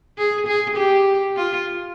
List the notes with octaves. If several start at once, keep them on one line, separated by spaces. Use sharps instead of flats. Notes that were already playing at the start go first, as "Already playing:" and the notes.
G#4
G#4
G4
F4